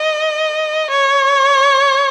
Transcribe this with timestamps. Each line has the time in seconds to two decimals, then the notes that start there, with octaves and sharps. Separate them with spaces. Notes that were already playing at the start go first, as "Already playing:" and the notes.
Already playing: D#5
0.90 C#5